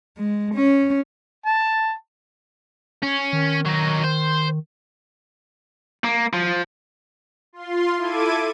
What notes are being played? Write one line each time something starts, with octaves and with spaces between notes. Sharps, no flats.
G#3
C#4
A5
C#4
D#3
F#3 D#4
C5
A#3
F3
F4 C6
E4 A4 D6 G#6 D#7